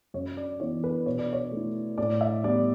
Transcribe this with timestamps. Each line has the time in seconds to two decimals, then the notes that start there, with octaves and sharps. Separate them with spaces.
0.14 F#2 C#5
0.37 D5
0.60 E3 B3 C#5
0.84 B4
1.06 B2 C#5
1.19 D5
1.33 C#5
1.51 A3 E4
1.98 A2 D5
2.21 E5
2.44 G3 B3 E4 D5